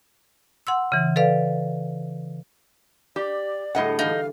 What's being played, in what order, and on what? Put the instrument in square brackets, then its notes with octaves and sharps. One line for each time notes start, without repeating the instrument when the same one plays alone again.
[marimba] F#5 C6 E6
C#3 E3
A4 B4 D5 F5
[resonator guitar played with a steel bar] G4 [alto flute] D5
[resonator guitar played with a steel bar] A2 D#5 F#5 [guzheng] D3 G3 G#3
[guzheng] D3 E3 [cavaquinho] D#4 [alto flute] F5